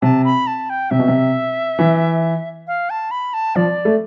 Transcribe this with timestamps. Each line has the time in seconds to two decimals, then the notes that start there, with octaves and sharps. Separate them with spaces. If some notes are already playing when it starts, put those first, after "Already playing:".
0.02 C3 A5
0.25 B5
0.47 A5
0.70 G5
0.90 C3 E5
0.99 B2
1.08 C3
1.79 E3
2.67 F5
2.90 A5
3.11 B5
3.34 A5
3.56 F3 D5
3.85 A3